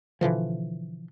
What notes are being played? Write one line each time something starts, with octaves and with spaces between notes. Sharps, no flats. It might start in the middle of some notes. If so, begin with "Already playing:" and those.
B2 D3 E3 F3